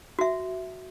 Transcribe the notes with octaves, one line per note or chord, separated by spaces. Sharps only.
F#4 E5